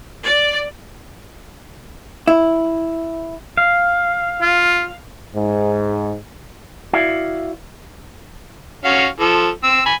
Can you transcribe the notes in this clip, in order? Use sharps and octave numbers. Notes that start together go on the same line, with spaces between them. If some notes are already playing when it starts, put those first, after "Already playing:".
D5
E4
F5
F4
G#2
E4 F#4 D5 E5 F5
C#4 F#4 F5
F3 A4
C4 E6
G#5 B5